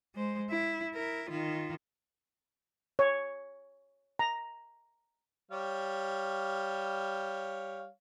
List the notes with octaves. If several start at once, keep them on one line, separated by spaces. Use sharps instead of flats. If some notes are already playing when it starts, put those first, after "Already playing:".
G#3 C5
E4
E4 A#4
D#3 F4
C#5
A#5
G3 C#5 F5